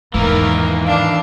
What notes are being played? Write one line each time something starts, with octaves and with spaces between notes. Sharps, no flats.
E2 G#2 D#3 E3 A#3 A#4
D4 F5